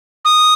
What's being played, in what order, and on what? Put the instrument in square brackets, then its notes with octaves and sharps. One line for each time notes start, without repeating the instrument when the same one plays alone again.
[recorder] D#6